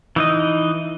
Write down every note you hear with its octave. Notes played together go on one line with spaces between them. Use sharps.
E3 D#4 D#5